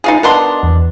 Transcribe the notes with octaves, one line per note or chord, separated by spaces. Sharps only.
D#4 F4 G#4
B2 D4 A#4 D#5 F#5 C6
E2